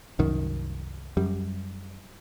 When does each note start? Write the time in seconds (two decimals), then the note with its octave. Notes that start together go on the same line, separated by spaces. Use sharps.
0.19 C2 F#2 D#3
1.17 F#2 G3